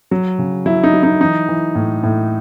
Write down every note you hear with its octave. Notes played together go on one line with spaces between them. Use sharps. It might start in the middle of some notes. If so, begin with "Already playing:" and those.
F#3
C#3
F#3 E4
D#4
F#3
D#4
E3 D#4
E3
A2
A2